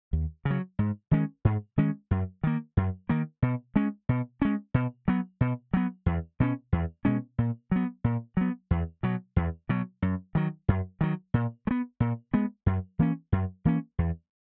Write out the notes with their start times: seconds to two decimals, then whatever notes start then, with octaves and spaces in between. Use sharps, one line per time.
0.13 D#2
0.45 C#3
0.50 F#3
0.79 G#2
1.11 D#3 G#3 C#4
1.45 G#2
1.77 D#3 G#3 C#4
2.11 F#2
2.44 D#3 A#3
2.77 F#2
3.09 D#3 A#3
3.42 B2
3.76 G#3 C#4
4.09 B2
4.42 G#3 C#4
4.74 B2
5.08 F#3 B3
5.41 B2
5.74 F#3 B3
6.06 E2
6.40 B2 G#3 C#4
6.72 E2
7.05 B2 G#3 C#4
7.38 A#2
7.71 F#3 B3
8.04 A#2
8.37 F#3 B3
8.71 E2
9.03 B2 F#3
9.36 E2
9.69 B2 F#3
10.02 F#2
10.35 D#3 F#3
10.68 F#2
11.01 D#3 F#3
11.34 A#2
11.67 G#3
11.71 B3
12.00 A#2
12.34 G#3 B3
12.66 F#2
12.99 E3 A#3 C#4
13.32 F#2
13.65 E3 A#3 C#4
13.98 E2